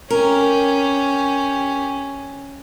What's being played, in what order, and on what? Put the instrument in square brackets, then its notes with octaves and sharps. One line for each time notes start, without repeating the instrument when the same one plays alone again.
[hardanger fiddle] C#4 G4 [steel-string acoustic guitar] A#4